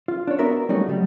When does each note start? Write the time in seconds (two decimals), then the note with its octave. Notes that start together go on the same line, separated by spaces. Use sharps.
0.08 F4
0.27 D4 C#5
0.39 B3 F#4 A#4 D5 E5
0.69 G3 A3 C#4 D#4 F#4
0.88 C#3 F#3 G3